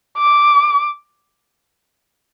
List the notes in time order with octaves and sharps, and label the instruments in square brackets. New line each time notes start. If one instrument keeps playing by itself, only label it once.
[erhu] D6